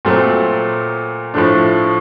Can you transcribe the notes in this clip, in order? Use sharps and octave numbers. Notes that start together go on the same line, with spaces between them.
A#2 F#3 A3 C4
A2 F3 A3 D4